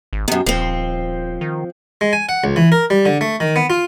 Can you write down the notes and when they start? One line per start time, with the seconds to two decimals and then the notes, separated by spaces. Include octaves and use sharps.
0.13 G#1
0.28 F#2 C3 B3
0.46 D#1 F3 C4
1.41 D#3
2.01 G#3
2.13 G#5
2.29 F#5
2.44 C#2
2.56 E3
2.72 A#4
2.90 G3
3.05 D3
3.21 A3
3.40 D#3
3.56 B3
3.70 F4